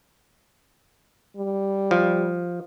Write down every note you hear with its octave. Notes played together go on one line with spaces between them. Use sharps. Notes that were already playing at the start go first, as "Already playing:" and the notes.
G3
F3